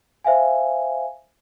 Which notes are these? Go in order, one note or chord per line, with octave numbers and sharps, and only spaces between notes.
C5 E5 F5 G#5